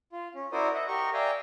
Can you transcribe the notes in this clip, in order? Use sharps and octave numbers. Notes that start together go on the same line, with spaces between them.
F4
C#4
E4 F#4 A#4 C5 D5 D#6
D#5 E5 F#5
G4 A#4 D#5 C#6
D5 E5 F5 G5 G#5 A#5